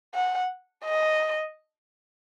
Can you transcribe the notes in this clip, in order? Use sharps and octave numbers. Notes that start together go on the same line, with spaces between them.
F#5
D#5